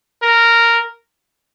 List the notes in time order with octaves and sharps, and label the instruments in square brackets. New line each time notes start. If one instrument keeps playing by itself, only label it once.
[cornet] A#4